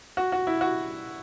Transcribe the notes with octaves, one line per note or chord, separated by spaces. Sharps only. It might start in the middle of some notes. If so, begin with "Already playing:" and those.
F#4
F#4
E4
F#4